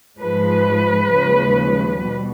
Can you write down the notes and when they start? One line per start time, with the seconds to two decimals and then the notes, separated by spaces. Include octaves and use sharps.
0.20 G#2 F3 G#3 B4
1.10 D#2 C#3 F3 G#3
2.01 B2 G3